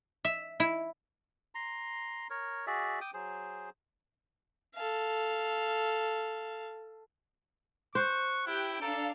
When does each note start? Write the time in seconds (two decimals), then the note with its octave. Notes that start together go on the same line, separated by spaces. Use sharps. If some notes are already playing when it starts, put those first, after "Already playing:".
0.25 E5
0.60 E4
1.55 A#5 C6
2.30 A#4 C#5
2.67 F#4 G#4 D5 E5
3.01 G5 D6 D#6
3.14 F#3 G#4 C5
4.75 A4 F5
7.95 C5 C#6 F#6
8.46 E4 G4 G6 D7
8.82 D4 A4 F5 A#5